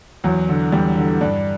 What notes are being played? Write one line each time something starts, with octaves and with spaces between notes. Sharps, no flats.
E2 F#3
D3
E2 G3
D3
G2 D4